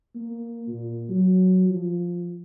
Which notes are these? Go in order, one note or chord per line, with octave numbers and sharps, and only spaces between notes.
A#3
A#2
F#3
F3